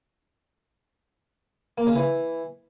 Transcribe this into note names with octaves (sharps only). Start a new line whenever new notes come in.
A#3
C#3
E3